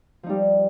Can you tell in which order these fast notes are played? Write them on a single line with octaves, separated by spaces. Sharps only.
F3 D#4 G3